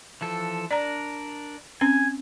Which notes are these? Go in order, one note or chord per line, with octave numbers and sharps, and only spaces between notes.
E3 F3 A4
D4 A#4 D5 A#5
C4 C#4 G#5